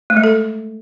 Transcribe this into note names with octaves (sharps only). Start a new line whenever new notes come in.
A3
G#3
A4